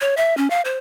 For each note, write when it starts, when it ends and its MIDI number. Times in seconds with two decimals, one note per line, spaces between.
0.01 0.15 73
0.17 0.36 76
0.37 0.50 61
0.50 0.61 77
0.65 0.78 72